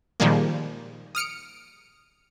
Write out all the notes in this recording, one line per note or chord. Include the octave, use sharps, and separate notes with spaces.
A#2 D#3 F3 G3 G#3 A#3
D#6 F6 C#7 D7